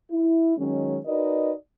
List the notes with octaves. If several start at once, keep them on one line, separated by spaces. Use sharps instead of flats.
E4
D#3 F#3 G#3 C#4
D#4 F#4 A#4 B4 D5 D#5